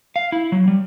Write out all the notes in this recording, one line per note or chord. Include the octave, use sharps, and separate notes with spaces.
F5
E4
F#3
G3